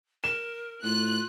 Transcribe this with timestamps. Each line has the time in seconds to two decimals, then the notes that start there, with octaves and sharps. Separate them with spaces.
0.24 A#4 E7
0.84 A2 F4 F#6